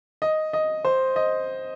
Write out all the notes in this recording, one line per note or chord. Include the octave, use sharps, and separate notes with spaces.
D#5
D#5
C5
D#5